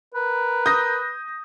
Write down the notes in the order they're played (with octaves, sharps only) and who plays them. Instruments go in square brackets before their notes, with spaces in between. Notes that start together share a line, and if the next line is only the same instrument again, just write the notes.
[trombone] A#4 [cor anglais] B4
[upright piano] D#6 [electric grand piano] G6 A#6